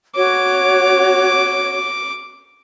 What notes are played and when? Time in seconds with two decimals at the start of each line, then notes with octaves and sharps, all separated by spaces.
0.16 F#4 C#5 D6